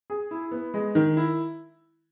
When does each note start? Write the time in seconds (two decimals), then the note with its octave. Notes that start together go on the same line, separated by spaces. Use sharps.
0.10 G#4
0.31 E4
0.51 B3
0.74 G#3
0.95 D#3
1.17 E4